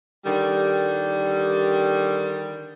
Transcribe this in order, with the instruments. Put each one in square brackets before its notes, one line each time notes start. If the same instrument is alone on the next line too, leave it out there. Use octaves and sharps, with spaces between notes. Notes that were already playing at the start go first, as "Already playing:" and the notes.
[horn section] D3 D#3 G3